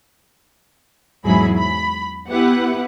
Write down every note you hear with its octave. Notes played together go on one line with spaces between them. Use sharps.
E2 G#2 F#3 E4 G#4 B5
B5
B3 E4 G4 B4 F#5